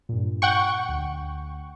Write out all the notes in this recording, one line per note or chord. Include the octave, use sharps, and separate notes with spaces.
G2 A#2
F#5 G5 C#6
D2